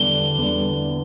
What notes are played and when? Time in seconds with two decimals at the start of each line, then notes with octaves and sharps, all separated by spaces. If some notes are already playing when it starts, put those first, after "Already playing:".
Already playing: E2 D3 G3 D4 G7
0.38 E2 D3 G3 D4